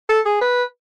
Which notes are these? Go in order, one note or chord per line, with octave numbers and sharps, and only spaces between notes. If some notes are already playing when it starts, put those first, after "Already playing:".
A4
G#4
B4